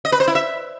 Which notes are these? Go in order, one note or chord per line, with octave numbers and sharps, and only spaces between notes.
D#5
B4
C5
E4
E5